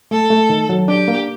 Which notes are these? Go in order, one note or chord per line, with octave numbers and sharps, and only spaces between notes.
A3 A4
A3
D#3
F#3
D4 G4
A#3